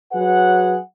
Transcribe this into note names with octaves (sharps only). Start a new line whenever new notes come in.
F#3 G#4 B4 F#5